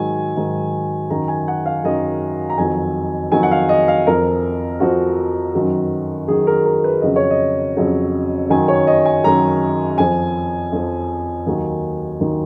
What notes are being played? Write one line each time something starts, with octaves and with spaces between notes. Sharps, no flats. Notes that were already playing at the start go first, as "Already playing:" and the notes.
Already playing: G#2 D#3 F#3 G#5
G#2 D#3 F#3
F#2 D#3 F#3 A#5
G#5
F#5
F5
F#2 D#3 F#3 D#5
A#5
F2 D#3 F#3 G#5
F2 D#3 F#3 G#5
F#5
F5
D#5
F5
F2 F3 A#4
F2 F3 F#4
F#2 D#3 F#3
F#2 D#3 F#3 G#4
A#4
A#4
B4
F2 C#3 F#3 D#5
C#5
D#5
F2 C#3 F#3
F#2 D#3 F#3 G#5
C#5
D#5
G#5
F#2 D#3 F#3 A#5
F2 F3 G#5
F2 F3
D#2 D#3 F#3
D#2 D#3 F#3